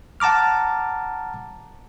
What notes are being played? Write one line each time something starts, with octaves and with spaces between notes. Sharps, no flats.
F#5 A5 A#5 D6 F6